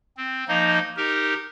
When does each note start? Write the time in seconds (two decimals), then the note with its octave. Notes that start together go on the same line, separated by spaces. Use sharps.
0.17 C4
0.48 F3 A#3 D#4 D#5
0.97 D#4 G4 A#4